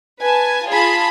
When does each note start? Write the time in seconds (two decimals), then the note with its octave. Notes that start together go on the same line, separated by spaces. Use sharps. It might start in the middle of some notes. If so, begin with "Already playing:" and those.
0.21 B4 G#5 A5
0.68 F4 G#4 A5 B5